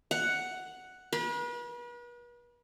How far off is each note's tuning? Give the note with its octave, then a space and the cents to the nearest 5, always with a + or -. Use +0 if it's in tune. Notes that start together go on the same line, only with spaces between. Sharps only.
F#5 +5
B4 -40